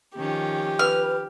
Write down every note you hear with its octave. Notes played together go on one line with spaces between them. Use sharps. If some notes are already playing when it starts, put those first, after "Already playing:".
D#3 F3 C#4 G4
B4 F6